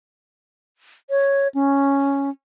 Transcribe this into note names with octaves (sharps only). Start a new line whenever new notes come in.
C#5
C#4